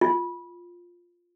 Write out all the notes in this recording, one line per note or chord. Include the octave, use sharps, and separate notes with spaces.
F4